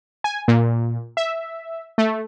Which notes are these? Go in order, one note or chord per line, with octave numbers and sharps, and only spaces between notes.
G#5
A#2
E5
A3